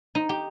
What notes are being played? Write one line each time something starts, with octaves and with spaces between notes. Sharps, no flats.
D#4
G4